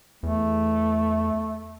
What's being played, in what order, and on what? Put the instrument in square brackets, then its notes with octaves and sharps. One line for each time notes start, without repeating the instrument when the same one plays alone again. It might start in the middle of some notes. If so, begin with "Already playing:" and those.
[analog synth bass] E2 [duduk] A3